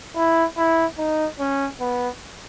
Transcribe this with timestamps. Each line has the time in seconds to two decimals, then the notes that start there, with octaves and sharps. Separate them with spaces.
0.16 E4
0.57 E4
0.98 D#4
1.40 C#4
1.80 B3